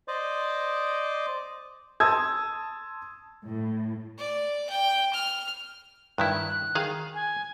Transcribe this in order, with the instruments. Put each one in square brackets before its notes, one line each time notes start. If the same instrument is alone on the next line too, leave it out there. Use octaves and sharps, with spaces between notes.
[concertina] C5 D5 D#5 D6
[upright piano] A5 C6 D#6 E6 G#6
[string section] A2
[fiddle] D5
G5
F6
[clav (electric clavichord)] G2 D#3 E4 [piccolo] F#6
[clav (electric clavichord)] D#3 G#4 F5
[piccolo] G#5